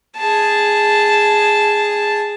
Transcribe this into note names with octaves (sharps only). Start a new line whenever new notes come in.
G#4 A5